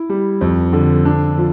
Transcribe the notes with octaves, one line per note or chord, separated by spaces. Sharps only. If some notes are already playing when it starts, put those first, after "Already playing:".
Already playing: E4
G3
F2
D3
D4
F3